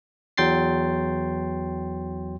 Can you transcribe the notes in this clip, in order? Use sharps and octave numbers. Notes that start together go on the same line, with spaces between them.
E2 F#3 G5 C6 A6 C7